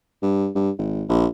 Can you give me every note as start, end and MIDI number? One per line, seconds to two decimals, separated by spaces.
0.23 0.49 43
0.55 0.71 43
0.78 1.04 32
1.09 1.26 34